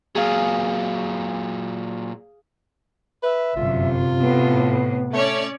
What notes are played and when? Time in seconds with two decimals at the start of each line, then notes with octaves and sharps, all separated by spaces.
0.15 A#2 F#3 G#4 F5
3.23 B4 E5
3.56 G1 F#2 C3 F4
4.20 A2 B3
5.13 A3 C#4 C#5 D5